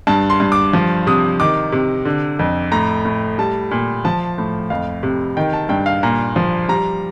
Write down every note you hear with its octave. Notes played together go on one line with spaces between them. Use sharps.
G2 A5
C6
G2
D6
F3
C3 D#6
D#3 D6
C3
D3
F2
A2 A#5
A2
G3 A5
A#2
F3 A5
A2
F2 F5
C3
D#3 G5
A5
G2 G5
F5
A#2 A#5
F3
G3 A#5